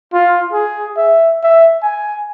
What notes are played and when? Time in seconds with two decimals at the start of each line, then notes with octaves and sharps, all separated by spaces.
0.13 F4
0.53 G#4
0.97 E5
1.43 E5
1.83 G#5